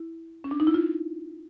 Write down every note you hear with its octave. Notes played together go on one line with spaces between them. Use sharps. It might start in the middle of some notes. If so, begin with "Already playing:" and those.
Already playing: E4
C#4
D4
D#4
E4
F4